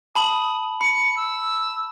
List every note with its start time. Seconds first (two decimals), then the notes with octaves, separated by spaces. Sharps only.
0.15 A5 B5 D#6 F#7
0.81 B5 C#7
1.17 E6